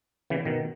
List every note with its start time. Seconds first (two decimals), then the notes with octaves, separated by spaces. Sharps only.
0.30 C#3 E3
0.45 B2 D#3